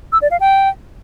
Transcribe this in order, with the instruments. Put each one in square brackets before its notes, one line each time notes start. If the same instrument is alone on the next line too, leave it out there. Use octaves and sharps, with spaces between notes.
[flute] E6
D5
F5
G5